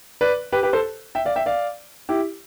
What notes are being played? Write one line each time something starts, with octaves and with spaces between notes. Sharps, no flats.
B4 D5
G4 B4
G4 B4
A4 C5
E5 G5
D5 F5
E5 G5
D5 F5
E4 G4